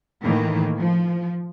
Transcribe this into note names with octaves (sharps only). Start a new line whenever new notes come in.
A2 D#3 E3 A#3
F3